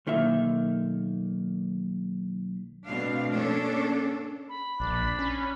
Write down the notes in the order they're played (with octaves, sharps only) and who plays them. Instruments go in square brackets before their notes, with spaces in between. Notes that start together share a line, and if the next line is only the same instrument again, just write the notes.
[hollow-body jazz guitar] B1 D#3 A#3 E5
[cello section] B2 A3 C4 D4 F5
A#3 C#4 D4 A4
[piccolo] B5
[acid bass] A#1 [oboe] D4
[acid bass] C#4